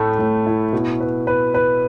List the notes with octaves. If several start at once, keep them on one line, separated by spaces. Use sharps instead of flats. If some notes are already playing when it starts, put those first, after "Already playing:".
Already playing: A2 A3
A2
E4
B2
B4
B4
B4